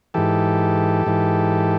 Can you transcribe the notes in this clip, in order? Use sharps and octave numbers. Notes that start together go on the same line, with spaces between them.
G#2 E3 G4 A4
G#2 E3